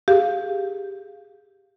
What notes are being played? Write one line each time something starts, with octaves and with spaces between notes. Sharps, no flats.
G4 G#4 F5